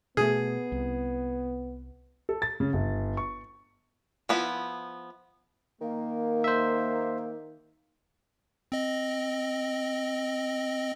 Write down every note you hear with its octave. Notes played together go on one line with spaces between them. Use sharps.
B2 A3 B3 G#4
C2
A4
A6
C#3
G1
C#6
F3 B3 E4
D#3 A#3
C5 E5
C4 D#5